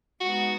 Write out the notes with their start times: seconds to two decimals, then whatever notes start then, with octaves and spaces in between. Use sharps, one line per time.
0.20 G#3 B3 D#4 F#4